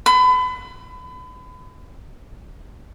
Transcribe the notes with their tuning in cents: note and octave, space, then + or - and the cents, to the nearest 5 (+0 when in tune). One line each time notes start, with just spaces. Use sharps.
B5 +35